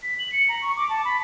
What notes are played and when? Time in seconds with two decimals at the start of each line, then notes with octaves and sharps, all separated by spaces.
0.03 B6
0.19 F#7
0.32 C#7
0.49 A#5
0.62 C#6
0.77 D6
0.89 A5
1.05 B5